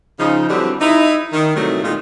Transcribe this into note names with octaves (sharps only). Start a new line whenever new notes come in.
C#3 F3 D#4
D3 E3 F#3 G3 C4 D4
D#4 E4
D#3
C3 D#3 E3 F#3 G3 A3
A#2 D#3 G#3 A#3 F4